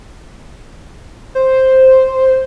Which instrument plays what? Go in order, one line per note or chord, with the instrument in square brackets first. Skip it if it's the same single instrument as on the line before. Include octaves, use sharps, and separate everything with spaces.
[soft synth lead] C5